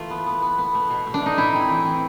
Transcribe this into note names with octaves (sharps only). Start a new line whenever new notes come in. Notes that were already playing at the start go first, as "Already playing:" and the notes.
Already playing: E3 A3 F4
B3
B3
B3
B3
A3
B2
A3
D4
A3 D#4
A2 E4
C4
E3
C4